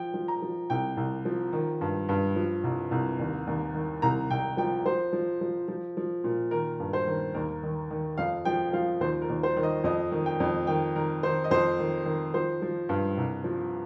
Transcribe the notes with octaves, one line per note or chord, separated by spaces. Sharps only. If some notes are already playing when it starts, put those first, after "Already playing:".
Already playing: F3 G5
F3
A#5
F3
C2 G5
C2
F3
D#3
G2
G2
F3
C2
C2
D#2
D#2
D#3
C2 A#5
C2 G5
F3 G5
F3 C5
F3
F3
F3
F3
A#2
D#3 A#4
G2
C5
D#3
D#2 A#4
D#3
D#3
F2 F5
F3 G5
F3 F5
D#2 C5
A#4
D#2
C5
D#3
D#5
F2 D#5
D#3
G5
F2
D#3 G5
D#3 A#4
D#3 C5
D#5
F2 C5
D#3
D#3
F3 C5
F3
G2
C2
F3